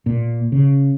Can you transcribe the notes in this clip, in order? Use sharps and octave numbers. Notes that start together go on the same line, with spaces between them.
A#2
C#3